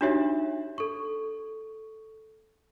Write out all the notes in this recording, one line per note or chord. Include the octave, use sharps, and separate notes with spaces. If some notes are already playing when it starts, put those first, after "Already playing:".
D4 D#4 F#4 G4 C#5 E5
A4 C#6